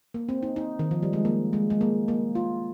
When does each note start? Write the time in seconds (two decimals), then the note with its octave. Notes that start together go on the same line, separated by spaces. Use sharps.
0.14 A#3
0.29 C4
0.43 D#4
0.56 D#4
0.79 D#3
0.91 F3
1.02 G3
1.13 G#3
1.25 A#3
1.53 G#3
1.70 G#3
1.81 A#3
2.08 A#3
2.35 F4